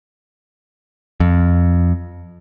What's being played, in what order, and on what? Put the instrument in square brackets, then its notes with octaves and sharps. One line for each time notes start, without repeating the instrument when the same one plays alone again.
[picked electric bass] F2